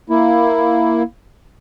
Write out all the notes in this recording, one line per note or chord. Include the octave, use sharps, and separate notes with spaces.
A#3 E4